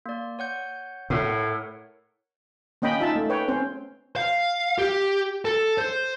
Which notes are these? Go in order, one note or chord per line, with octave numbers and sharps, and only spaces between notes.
A#3 D5
C#5 F#5 G6
A2 A#4 C#5 F#5
A#3 C#4 D#5 G5 B5
D#4 F4 E5 A5
A3
B4 C#5 G5
C4 C#4 C5
F5
G4
A4
C5